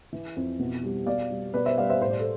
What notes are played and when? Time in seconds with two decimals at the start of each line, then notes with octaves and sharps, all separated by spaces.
0.13 E3
0.36 F2
0.59 B2
0.84 G3
1.06 B2 D5 F5
1.30 G3
1.54 B2 B4 D5
1.65 C5 E5
1.77 G3 D5 F5
1.89 C5 E5
2.01 A2 C5
2.10 D5
2.20 A4 C5